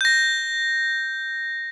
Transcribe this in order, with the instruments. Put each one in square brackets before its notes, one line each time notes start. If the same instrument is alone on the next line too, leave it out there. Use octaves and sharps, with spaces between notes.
[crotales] G6 A#6